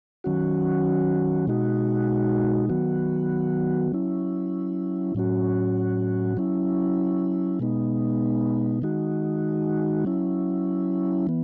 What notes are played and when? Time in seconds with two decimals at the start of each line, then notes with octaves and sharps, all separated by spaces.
0.24 D#3 F#3 C#4 F#4
1.47 B2 G#3 D#4 F#4
2.69 D#3 F#3 B3 F#4
3.92 F#3 C#4 E4
5.15 A2 F#3 C#4 F#4
6.37 F#3 C#4 E4
7.59 B2 G#3 B3 D#4
8.82 D#3 G#3 D#4 F#4
10.05 F#3 C#4 E4
11.27 E3 B3